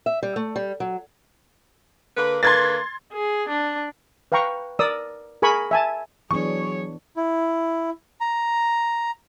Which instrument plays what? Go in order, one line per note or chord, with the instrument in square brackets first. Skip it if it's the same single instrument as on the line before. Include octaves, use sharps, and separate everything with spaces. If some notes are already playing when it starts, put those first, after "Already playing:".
[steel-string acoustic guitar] E5
G3
A3
G3
F#3
[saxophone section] D3 A#3 B4
[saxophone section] D3 A#3 B4 [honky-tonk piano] C6 G#6 A6
[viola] G#4
D4
[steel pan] B4 F5 G5 A#5 C#6
A#4 D5 D#6 E6
G#4 A#4 G#5 B5 C#6
E5 G#5 A5
[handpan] E3 B3 D4 [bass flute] F#3 [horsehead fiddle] G#4 C#5 [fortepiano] C#6
[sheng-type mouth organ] E4
A#5